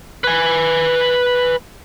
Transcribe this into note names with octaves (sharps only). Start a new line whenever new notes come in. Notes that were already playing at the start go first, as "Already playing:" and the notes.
B4 G#5